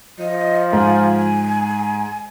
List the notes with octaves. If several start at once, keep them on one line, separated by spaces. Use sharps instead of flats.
F3 D#5
G#2 G#5